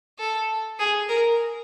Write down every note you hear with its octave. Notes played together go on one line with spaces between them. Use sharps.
A4
G#4
A#4